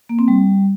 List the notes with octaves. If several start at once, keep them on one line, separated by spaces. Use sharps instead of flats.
A#3
C4
G3